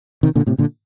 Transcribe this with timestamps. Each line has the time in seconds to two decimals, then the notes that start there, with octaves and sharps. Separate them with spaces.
0.23 C3 D#3
0.35 A#2 D3
0.47 A2 C3
0.58 A#2 D3